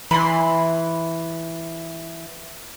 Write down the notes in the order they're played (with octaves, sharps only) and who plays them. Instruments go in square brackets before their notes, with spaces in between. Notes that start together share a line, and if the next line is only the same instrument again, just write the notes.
[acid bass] E3 [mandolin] B5 C6